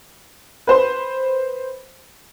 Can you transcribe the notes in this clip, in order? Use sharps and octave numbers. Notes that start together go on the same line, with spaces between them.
B4 C5 C6